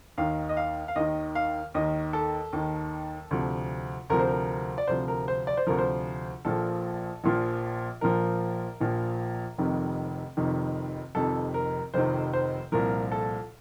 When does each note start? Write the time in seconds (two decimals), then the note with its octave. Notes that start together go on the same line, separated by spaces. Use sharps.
0.18 D#2 D#3 F5
0.49 D#5
0.57 F5
0.88 F5
0.96 D#2 D#3 D#5
1.35 F5
1.74 D#2 D#3 D#5
2.13 A4
2.53 D#2 D#3
3.31 D2 C3 F3
4.10 D2 C3 F3 A#4
4.19 C5
4.29 A#4
4.78 D5
4.87 D2 C3 F3 C5
5.08 A#4
5.28 C5
5.47 D5
5.57 C5
5.67 D2 C3 F3 A#4
5.78 C5
6.45 A#1 A#2 F3 A4
7.24 A#1 A#2 F3
8.01 A#1 A#2 F3 A#4
8.80 A#1 A#2 F3
9.58 F1 F2 C3 D#3
10.37 F1 F2 C3 D#3
11.15 F1 F2 C3 D#3 A4
11.54 A#4
11.94 F1 F2 C3 D#3 C5
12.33 C5
12.72 C2 A#2 F3 A#4
13.12 A4